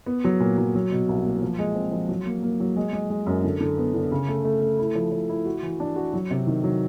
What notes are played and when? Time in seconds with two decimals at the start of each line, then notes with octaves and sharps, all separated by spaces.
0.06 B3
0.24 F#3
0.40 A#2
0.58 F#3
0.75 F#3
0.91 B2
1.09 C2
1.25 A#3
1.42 F3
1.59 G#3
1.75 C4
1.92 F3
2.09 F#3
2.26 A#3
2.42 A#3
2.60 F#3
2.76 G#3
2.93 G#3
3.10 G#3
3.26 F#2
3.44 D3
3.61 D3
3.78 B3
3.94 D3
4.11 C#3
4.28 A3
4.45 A3
4.61 A3
4.79 E4
4.95 F3
5.12 F3
5.30 E4
5.46 F#4
5.63 E3
5.80 D4
5.96 F#4
6.13 F#3
6.31 C3
6.47 D#3
6.64 F#3